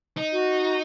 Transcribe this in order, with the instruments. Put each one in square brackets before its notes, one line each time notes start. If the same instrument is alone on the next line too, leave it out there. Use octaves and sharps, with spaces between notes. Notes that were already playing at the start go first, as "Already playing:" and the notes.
[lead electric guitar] D#4
[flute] F#4